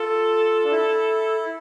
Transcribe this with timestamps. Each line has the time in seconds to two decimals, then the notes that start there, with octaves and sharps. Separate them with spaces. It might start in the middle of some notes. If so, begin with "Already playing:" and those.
Already playing: F4 A4
0.64 D4
0.72 E4